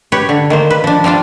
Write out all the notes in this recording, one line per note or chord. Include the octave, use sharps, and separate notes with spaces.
G4 B4 C#5
D3
D#3 A#3 C5
B4
F3 D4
F3 G3 D4 F4